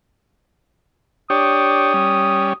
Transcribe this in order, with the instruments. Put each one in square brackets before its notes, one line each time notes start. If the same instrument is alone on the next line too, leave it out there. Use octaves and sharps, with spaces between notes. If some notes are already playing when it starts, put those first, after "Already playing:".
[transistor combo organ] D4 G4 C#5 [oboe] D#6
[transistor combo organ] G3 C#4